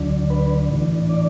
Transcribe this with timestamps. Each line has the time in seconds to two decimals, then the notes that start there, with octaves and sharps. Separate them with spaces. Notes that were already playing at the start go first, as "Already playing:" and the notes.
Already playing: D2 D3 F#3 D4
0.30 B4
0.70 A2 E3 D4
1.09 D5